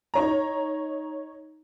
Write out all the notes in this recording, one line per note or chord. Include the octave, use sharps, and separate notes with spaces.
D#4 C#5 A#5